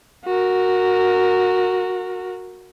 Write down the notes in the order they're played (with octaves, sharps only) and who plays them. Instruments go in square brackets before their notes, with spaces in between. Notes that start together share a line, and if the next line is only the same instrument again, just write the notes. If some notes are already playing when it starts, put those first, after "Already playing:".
[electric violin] F#4 A#4